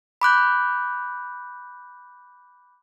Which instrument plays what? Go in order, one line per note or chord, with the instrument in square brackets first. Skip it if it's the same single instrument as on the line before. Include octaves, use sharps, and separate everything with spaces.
[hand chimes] B5 D6 F#6 G6